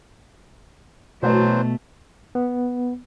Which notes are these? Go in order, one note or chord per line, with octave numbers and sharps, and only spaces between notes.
B2 E3 F#3 A3 C5
B3